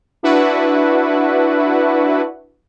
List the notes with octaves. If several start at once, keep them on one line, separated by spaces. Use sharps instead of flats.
D4 E4 F#4 B4 F#5